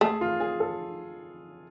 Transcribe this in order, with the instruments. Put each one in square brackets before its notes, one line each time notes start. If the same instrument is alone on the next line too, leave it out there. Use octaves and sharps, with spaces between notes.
[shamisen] A3 [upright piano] G#4
[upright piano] F4
G#4
A4